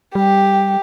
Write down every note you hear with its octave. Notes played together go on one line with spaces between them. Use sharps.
G3 G4